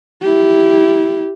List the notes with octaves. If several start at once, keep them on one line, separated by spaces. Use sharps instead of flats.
E4 G4